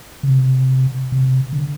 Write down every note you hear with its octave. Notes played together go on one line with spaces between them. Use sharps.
C#3
C3
C3
D3